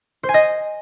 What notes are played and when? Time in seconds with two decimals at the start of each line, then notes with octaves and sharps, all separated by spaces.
0.23 C5
0.29 G#5
0.34 D#5